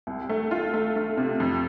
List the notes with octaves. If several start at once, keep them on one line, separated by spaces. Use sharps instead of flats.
C2
A3
F4
A3
A3
C3
F2